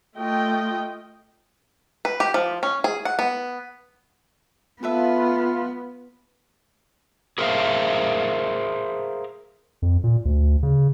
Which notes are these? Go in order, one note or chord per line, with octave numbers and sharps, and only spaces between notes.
A3 F4 D#5 G5
B4
G4
F3
C#4
G#4
F#5
B3
B3 F4 A4 B4 E5
G#4 A#4 C5 E5 F5
F2
A#2
D2
C#3